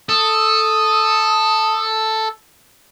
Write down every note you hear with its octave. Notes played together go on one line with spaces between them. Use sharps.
A4 D#6